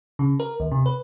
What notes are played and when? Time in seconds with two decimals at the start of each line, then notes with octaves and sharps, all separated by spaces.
0.19 C#3
0.40 A#4
0.60 D#2
0.72 C3
0.86 B4